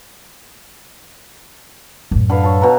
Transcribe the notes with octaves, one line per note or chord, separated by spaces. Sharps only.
F#2 A2
D3 B4 F5
A4 C#5
B2 B4 A#5